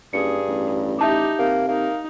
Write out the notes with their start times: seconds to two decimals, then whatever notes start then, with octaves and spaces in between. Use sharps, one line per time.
0.13 F#1 G2 G#4 C#7
0.48 A1
0.99 D#4 G4 E5 A5 D6
1.39 C3 A#3
1.68 A#3 D#4